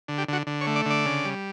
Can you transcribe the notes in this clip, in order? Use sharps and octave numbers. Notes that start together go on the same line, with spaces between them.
D3
G4
D3 F#4
D3
C#5
A3
D5
D3 D5
C#3
G3